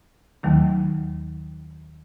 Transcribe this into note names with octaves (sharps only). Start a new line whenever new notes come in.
D#2 D#3 F#3 A3